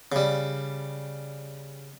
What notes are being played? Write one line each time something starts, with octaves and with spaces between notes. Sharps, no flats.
C#3 G3